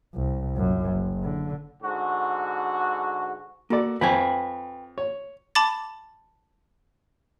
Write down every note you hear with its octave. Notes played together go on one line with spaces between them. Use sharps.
C2
A#1 F#2
F#1
D3
G#2 D3 F#4
A#3 F#4 A4 D5
F2 B4 G5 G#5
C#5
A5 B5 D6 A6